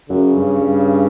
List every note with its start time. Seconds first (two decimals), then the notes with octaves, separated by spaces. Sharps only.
0.09 F#2 C#3
0.35 G2
0.61 G2